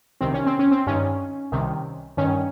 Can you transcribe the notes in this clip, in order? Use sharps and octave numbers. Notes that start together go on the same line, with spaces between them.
C2 C3 D#3 C4
C#4
C4
C#4
C4
G2 D#3 C#4
C2 C3 D#3
G2 D#3 C#4